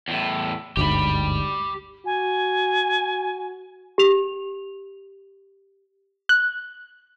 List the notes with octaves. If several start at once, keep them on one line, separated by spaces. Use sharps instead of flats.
E2 A2
G1 D2 G#2 G4 B5
F#4 G#5
G4 F7
F#6